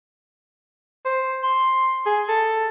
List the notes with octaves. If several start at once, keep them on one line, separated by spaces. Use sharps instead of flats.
C5
C6
G#4
A4